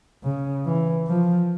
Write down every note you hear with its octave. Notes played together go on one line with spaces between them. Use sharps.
C#3
E3
F3